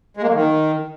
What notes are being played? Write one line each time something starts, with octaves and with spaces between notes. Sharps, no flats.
G#3
A#3
F#3
D#3